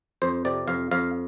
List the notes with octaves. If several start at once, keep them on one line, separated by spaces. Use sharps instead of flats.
F2 C5
C3 D5
F2 F5
F2 F5